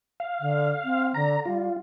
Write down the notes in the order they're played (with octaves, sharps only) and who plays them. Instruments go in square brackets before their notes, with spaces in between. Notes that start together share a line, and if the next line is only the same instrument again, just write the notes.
[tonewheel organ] F5
[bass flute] D3
C4
[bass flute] D3 [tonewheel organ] A#5
[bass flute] G3 [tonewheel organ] F4